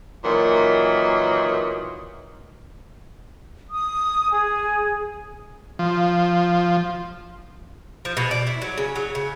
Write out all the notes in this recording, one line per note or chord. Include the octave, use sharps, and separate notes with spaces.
A#2 D#3 E3 F#3
D#6
G#4
F3
F3
B2
D5
E4
F#3
C#3
F#3
C#3